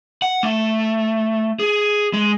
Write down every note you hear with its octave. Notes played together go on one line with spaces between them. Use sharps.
F#5
A3
G#4
G#3